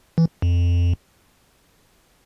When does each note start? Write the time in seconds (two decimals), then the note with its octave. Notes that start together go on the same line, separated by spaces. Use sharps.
0.18 E3
0.42 F2